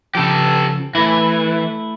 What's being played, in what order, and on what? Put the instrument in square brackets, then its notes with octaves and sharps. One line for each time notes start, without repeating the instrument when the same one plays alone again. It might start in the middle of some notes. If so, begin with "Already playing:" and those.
[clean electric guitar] C#3 F3 [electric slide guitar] G4 A4
[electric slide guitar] E3 [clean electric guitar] A3 E4